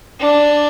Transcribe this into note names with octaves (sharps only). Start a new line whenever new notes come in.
D4